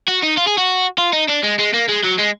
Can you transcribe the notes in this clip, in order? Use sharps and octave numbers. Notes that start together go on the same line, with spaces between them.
F#4
D#4
F4
G#4
F#4
F4
D#4
D4
G#3
G#3
A#3
G#3
F#3
G#3